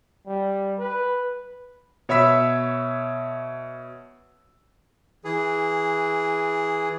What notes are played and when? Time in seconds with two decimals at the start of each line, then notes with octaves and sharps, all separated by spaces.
0.26 G3
0.79 B4
2.09 B2 C#5 E5 B5 E6 B6
5.24 E3 G#4